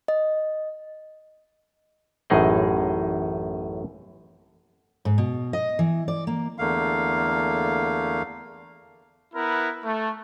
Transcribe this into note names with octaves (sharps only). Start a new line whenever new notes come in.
D#5
A1 F#2 A2 D#4 G#4 D#5
G#2
B2
D#5
E3
D5
A#3
E2 D3 A3 A#3 F5
B3 E4 A#4 B4
A3